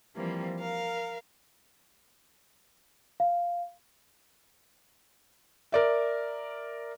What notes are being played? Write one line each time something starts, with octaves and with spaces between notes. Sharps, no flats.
E3 F3 G3 A#3 C4
A#4 F5
F5
A#4 D5 E5